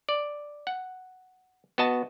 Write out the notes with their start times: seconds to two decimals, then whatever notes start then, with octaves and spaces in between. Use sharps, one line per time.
0.09 D5
0.67 F#5
1.78 B3 F#4 D#5 A5